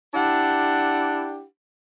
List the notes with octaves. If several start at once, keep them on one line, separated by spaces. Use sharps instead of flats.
D4 E4 G4 F#5